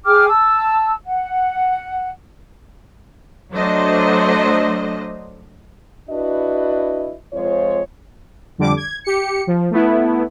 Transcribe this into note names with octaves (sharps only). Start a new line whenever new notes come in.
G#4 G5 D6 F6
A5 E6
F#5
F#3 A3 D4 C5 D#5
D4 E4 F#4 B4 D#5
F2 G#3 F4 C5 C#5
F2 D3 G3 D6
G#6
G4 C#7
F3
A3 B3 E4